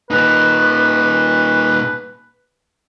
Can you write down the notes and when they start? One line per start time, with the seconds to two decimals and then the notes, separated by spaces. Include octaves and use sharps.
0.11 A#2 D#4 B4